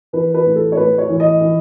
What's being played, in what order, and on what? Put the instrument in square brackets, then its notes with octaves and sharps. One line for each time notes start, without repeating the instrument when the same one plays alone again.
[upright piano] E3 B4
B4
A2
A4
C#5
A2 B4
C#5
E3
D#5
E3